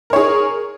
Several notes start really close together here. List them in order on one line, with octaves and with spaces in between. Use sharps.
A#4 C#5 G#4